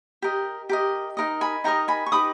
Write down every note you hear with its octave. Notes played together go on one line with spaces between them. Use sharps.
G4 A#4 D#5
G4 A#4 D#5
D#4 A#4 D#5
G#5 B5
D#4 A#4 D#5 G5 A#5
G#5 B5
C#6
D#4 G4 B4 B5 D#6